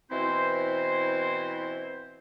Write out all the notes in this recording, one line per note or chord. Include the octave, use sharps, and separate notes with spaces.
B2 E3 C4 E4 C5